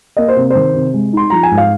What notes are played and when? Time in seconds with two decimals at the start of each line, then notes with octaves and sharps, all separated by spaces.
0.17 A#3 D#5
0.28 C5
0.36 C3
0.50 D#3 C5
0.74 C3
0.94 G#3
1.13 D#4 C6
1.30 F3 A#5
1.43 G#5
1.51 G#2
1.57 F5